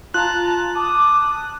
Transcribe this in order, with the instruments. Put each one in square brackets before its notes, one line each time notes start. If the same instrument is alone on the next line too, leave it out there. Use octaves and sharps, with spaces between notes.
[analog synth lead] F4 [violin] A5 A#5 [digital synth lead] F#6
[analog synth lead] A5 [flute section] D6 [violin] D#6